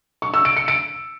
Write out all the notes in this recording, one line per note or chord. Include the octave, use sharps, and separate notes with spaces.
C#6
E6
D7
C#7
D7